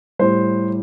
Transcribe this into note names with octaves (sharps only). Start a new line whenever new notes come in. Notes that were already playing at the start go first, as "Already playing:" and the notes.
A2 G3 C5